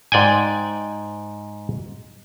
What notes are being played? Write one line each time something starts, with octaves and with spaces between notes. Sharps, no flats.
G#2 D5 G5 G#5